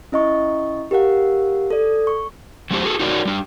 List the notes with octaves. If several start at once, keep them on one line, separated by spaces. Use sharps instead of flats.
C#4 E4 D#5 E5 C#6
G4 A#4 F5 F#5
A4 D5
C#6
F#3 A3 C#4 F4 G4 C5
F#4 G#4 A4
D#4 F#4 A#4 C#5 D5
G3 D4